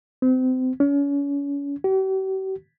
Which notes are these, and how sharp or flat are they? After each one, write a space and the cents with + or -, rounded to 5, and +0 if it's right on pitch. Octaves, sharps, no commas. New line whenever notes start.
C4 -30
C#4 +35
G4 -45